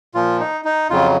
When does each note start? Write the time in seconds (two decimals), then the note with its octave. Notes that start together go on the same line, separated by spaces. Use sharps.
0.15 A#2 F3 F4
0.40 D#4
0.65 D#4
0.90 F2 C#3 F#3 F4